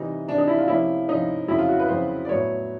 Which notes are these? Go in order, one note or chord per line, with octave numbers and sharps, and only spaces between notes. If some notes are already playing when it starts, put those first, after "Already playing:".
Already playing: C3 E3 G3 D#4
C3 E3 G3 D4
D#4
E4
F4
C3 F3 A#3 C#4 E4
C3 F3 A#3 C#4 D#4
F2 C#3 F#3 E4
F4
F#4
B4
F2 C#3 F#3 C5
D5
A2 F#3 B3 C#5